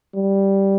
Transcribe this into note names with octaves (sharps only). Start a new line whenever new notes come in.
G3